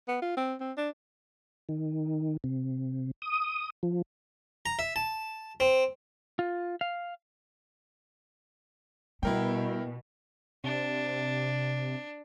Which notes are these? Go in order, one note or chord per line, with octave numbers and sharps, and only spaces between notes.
B3
F4
C4
C4
D4
D#3
C3
D#6
F3
A#5
E5
A5
C4
F4
F5
B2 G3 E4 A#4 G5
C3 D4